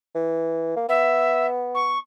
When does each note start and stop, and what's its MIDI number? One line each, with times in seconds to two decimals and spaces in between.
0.15 0.74 52
0.76 0.89 58
0.89 1.95 59
0.89 1.46 76
1.75 1.98 85